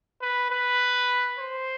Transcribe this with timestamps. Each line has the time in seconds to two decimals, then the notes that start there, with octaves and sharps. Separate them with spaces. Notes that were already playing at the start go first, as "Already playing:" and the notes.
0.21 B4
0.51 B4
1.39 C5